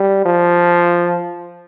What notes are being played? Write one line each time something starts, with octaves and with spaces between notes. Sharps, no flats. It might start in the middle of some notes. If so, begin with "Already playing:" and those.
Already playing: G3
F3